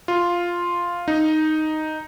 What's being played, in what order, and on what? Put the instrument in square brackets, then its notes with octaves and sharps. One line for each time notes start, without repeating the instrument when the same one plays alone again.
[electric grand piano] F4
D#4